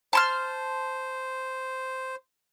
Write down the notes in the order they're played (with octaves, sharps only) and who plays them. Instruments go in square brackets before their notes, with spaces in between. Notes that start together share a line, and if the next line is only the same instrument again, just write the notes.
[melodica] C5 [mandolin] A5 C6 F6